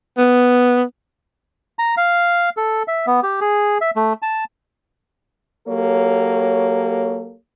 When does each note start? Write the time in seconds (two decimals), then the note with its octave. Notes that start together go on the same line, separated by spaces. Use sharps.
0.18 B3
1.79 A#5
1.97 F5
2.57 A4
2.88 E5
3.07 B3
3.23 G4
3.41 G#4
3.81 E5
3.96 A3
4.22 A5
5.67 F#3 A#3 G4 A4 C#5